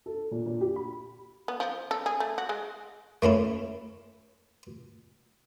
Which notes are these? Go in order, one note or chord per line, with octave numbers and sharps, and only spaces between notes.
A4
A#2
A#2
G4
B5
B3
F3
A4
G#4
A3
F#4
G#3
A3 A#3 C#4 E4